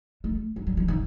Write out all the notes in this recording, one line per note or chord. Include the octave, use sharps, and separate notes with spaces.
A3
F#3
F#3
F3
D#3